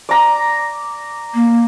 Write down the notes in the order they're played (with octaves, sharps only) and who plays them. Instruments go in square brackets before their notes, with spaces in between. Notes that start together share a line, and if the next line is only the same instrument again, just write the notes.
[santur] D5 A#5
[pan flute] A#3